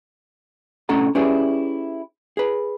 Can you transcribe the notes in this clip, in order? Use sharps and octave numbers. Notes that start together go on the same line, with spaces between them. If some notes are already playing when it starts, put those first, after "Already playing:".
A2 C3 C#4 A4 F#5 A#5
C#4 E4 G4 G#4 B4 D5
G#4 B4